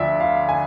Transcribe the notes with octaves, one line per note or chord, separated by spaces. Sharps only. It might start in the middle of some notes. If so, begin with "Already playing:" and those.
Already playing: D2 D3 F3 D5 E5
F5
G#5